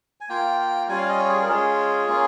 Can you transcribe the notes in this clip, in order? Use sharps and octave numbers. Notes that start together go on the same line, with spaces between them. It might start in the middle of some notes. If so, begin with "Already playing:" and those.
G#5
A#3 F4 G5
G3 C#4 F4 G#5
F5
D#5
C#5
G#4
A#4
G#3 C#4 F4 G#4
A#3 C#4 F4